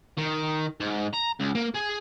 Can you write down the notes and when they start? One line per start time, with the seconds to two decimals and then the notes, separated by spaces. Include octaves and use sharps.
0.17 D#3
0.80 G#2
1.14 A#5
1.40 C#2
1.55 A#3
1.74 G#4